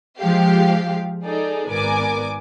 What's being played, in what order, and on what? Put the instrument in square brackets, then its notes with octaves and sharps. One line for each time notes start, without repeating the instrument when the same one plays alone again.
[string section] F3 G#3 G4 F5
D#4 G#4 A4 D5
G#1 B3 A#4 D5 G#5 D6